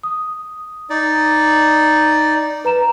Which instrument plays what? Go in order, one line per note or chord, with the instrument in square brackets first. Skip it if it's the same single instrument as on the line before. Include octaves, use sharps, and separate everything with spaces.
[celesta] D#6
[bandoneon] D#4 D5
[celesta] B4 A#5 E7